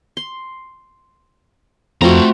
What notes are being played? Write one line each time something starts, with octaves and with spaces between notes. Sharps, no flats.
C6
F2 A3 C4 F4 F#4 A#5